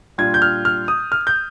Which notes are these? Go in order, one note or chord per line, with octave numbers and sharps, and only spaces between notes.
A#2 G3 D4 F4 G#6
G6
F6
F6
D#6
F6
G6